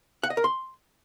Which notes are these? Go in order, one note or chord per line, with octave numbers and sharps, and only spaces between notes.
F#5
D#5
A#4
C6